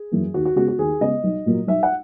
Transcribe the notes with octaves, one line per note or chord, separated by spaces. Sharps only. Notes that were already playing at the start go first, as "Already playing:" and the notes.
Already playing: G#4
F#2 E3 A#3
D#2 F#4
F#4
C#3 G#3 B3 F#4
F#4
D#2 G#4
C#3 G#3 B3 D#5
B1
A#2 F#3 A#3
B1 E5
F#5